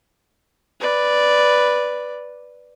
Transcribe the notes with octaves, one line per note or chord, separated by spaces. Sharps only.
B4 D5